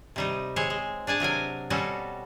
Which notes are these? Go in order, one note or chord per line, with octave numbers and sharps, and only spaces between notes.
C3 G3 D#4
G#3 C4 C5 C#5
G#3
D4 G#4 G#5 A5
C3 F#3 A#4 G#5
B2 G3 C4 C#4 F#4 A4